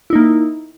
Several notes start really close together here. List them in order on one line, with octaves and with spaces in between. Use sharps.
E4 D#4 A#3